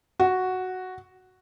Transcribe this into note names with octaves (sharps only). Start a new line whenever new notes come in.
F#4